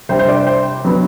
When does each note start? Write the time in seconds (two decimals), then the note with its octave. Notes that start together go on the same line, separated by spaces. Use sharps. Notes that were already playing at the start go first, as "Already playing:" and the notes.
0.09 C3 G3 D4 C5
0.19 C5
0.28 D5
0.47 C5
0.85 F#3 B3 D4